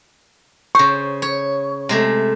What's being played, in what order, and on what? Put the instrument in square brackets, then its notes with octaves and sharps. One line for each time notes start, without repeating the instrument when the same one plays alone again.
[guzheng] C#3 C5 [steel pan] C#6
[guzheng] C#5
C3 G#3 A3